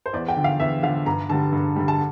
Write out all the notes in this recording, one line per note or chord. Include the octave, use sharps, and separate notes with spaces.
C5
E2 D5
G5
D3 F3
F5
E2 E5
D3 F3 F5
G2 A#5
D3 G3 A5
G2
D3 G3
A5